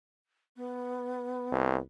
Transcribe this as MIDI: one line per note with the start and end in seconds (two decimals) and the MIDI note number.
0.56 1.81 59
1.52 1.78 36